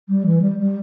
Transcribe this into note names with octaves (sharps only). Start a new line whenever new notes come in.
G3
E3
G3
G3